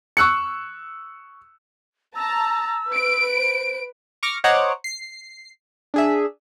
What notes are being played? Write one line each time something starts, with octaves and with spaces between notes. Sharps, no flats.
C#6 E6 F#6 C#7
A5 A#5 E6
B4 D7
C5
C#6 D6 F6 A#6
C5 C#5 D#5 F#5 A#5 D6
C7
D4 G#4 E5